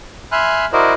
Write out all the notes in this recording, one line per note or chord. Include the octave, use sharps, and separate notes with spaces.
E5 G#5 B5 C6 F6 F#6
E4 F#4 A#4 C5 D5 D#5